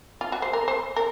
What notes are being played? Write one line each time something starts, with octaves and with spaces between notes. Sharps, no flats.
F4
F#4
C5
A#4
C5
A#4